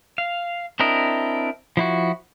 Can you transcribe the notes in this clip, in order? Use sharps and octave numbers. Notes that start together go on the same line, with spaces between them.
F5
C4 D4 E4 A#4 D#5
F3 E4 F#4